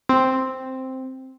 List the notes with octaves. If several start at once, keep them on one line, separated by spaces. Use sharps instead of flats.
C4